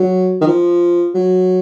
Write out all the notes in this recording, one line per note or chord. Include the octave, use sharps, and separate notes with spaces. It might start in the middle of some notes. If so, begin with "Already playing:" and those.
Already playing: F#3
D#3
F3
F#3